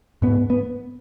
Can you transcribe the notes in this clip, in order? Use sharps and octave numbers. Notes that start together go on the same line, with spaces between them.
G#2 B3
B3